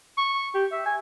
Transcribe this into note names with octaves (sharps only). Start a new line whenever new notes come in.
C#6
G4
E5
G#5